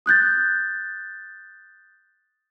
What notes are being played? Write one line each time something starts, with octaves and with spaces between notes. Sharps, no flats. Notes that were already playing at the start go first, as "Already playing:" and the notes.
D#6 F#6 G6 A6